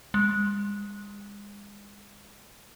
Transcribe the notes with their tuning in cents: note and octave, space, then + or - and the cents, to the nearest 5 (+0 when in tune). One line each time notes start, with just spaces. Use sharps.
G#3 -35